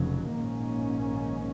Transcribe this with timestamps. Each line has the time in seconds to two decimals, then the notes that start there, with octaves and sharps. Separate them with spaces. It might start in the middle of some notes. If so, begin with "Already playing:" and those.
Already playing: F1 F2 C#3 F#3
0.34 A#1 G#2 D#3 A#3 C#4